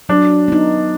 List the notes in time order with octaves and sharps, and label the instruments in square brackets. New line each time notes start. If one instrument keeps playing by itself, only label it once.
[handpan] F#3 [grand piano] D4
[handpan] B3 D#4